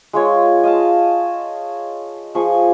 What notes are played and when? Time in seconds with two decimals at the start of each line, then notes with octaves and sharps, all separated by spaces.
0.13 G#3 F4 C#5
0.64 D#5 F5 A5
2.35 F3 G#4 C#6